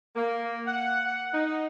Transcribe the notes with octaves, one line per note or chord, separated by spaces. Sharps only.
A#3
F#5
D#4